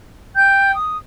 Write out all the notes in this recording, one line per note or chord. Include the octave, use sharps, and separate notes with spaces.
G5 G6
D#6